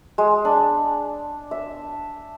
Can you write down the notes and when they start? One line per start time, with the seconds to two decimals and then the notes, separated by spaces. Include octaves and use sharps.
0.18 G#3
0.45 D4
1.51 E5